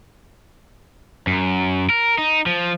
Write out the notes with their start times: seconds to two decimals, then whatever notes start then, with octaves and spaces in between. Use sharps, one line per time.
1.27 F#2
1.90 A#4
2.18 D#4
2.46 F3